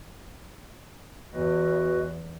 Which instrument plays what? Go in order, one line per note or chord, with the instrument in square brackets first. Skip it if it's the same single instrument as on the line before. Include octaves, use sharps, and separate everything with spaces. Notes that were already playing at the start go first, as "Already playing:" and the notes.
[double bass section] E2 [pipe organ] F#4 B4 D#5